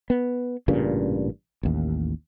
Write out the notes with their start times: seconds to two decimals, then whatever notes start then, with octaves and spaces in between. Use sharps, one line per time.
0.10 B3
0.68 A1 G2 A#2 C#3
1.63 A1 D#2